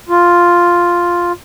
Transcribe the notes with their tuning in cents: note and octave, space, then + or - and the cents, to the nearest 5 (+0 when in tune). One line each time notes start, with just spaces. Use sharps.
F4 +0